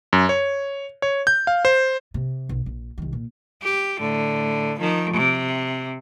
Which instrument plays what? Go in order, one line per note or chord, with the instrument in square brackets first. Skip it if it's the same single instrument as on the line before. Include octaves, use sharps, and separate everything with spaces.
[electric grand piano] F#2
C#5
C#5
G6
F5
C5
[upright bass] C3
B1
A#1
C2 D#3
A#2
[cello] G4
A2 D3
D#3 F3
C3